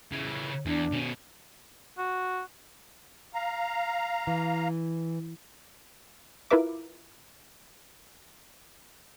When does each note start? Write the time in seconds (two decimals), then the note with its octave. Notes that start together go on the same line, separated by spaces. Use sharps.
0.12 C#3 E3
0.66 E2 D4
0.92 B2 C#4
1.98 F#4
3.34 F5 A#5
4.27 E3
6.51 E4 F4 A#4 B4 E5 D6